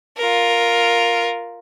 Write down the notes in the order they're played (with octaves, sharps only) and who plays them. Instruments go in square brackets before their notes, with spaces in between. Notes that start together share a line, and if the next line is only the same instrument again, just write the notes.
[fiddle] F4 A#4